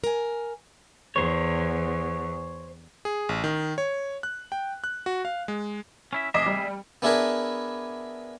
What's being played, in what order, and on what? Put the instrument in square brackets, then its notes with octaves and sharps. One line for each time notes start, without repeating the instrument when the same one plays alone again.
[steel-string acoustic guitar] A#4 G#5
[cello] E2 [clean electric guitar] C5 C#5
[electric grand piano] G#4
A1
D#3
C#5
F#6
G5
F#6
F#4
F5
G#3
[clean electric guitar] C#4 E4 E5
[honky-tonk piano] F1 D#5 D6 [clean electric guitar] G#4 E5
[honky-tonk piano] G3
[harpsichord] B3 D4 E4 G#4 A#4 B4